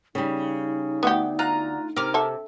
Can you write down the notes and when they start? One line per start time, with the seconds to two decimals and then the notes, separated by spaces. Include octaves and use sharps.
0.15 C#3 G3 D#4
1.03 D2 B3 F#4 G4
1.39 F4 A#5 F#6
1.96 C3 A#4 D6 F6
2.14 A4 E5